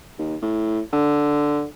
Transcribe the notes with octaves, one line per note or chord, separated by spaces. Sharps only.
D#2
A2
D3